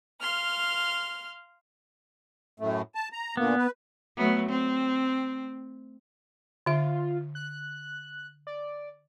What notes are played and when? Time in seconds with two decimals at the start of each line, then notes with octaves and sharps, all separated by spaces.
0.20 F5 C6 F6
2.60 F#2 A2 A3
2.95 A5
3.12 A#5
3.37 A#2 D3 A#3 B3
3.58 B4
4.17 F#3 A3 B3
4.49 C4
6.66 D3 F4 E5
7.35 F#6
8.47 D5